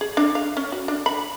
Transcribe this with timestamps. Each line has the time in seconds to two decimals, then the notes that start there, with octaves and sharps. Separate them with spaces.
0.01 G#4
0.17 D4
0.35 F5
0.57 C#4
0.72 F#4
0.88 D4
1.06 B5